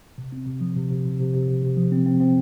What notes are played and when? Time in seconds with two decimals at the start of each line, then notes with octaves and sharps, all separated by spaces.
0.18 C3
0.32 C4
0.46 C3
0.61 F3
0.76 C3
0.91 C3
1.05 C3
1.19 C3
1.33 C3
1.48 C3
1.62 C3
1.77 F3
1.92 C4
2.06 C4
2.20 C4